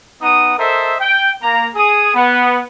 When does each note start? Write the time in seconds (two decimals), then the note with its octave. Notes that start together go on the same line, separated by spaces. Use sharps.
0.22 B3 D#4 F#5 D#6
0.58 A4 A#4 C5 D#5 E5
1.00 G5
1.43 A#3 A#5
1.75 G#4 D#6
2.15 B3